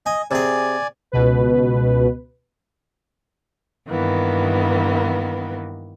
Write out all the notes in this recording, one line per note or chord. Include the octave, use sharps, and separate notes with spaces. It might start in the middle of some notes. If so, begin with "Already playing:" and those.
D#5 G#5
C3 G#4 D5 G#5
C#2 B2 B4
G2 D#3 E3 A#3 B3